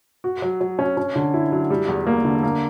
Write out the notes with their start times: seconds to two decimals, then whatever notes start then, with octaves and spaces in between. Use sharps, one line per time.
0.24 F#4
0.42 F#3
0.61 F#3
0.79 C#4
0.97 C#4
1.16 D3
1.34 E4
1.52 F#3
1.70 G3
1.88 E2
2.07 A#3
2.25 D3
2.43 A#3